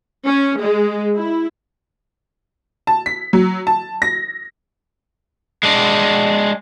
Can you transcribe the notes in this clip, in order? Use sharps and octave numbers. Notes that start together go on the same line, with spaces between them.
C#4
G#3
E4
A5
B6
F#3
A5
A#6
G#3 D4